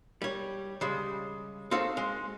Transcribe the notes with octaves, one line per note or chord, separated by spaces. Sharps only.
G3 C#5
C#3 G3 G#3
C4 D#4 F#4 A4 F5
G#3